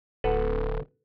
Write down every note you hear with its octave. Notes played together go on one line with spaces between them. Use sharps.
D1 A4 B4 F#5